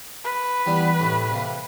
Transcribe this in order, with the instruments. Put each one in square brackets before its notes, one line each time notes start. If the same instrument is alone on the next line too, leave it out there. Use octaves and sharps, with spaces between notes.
[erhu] B4
[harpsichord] E3 G3 B3
A2 C3 A3
C3 A#3